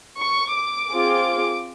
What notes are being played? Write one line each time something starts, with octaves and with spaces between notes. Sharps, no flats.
C#6
D6
C4 F4 G#4